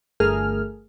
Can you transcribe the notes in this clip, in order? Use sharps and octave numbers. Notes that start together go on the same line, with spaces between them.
G1 A3 G#4 A#4 F6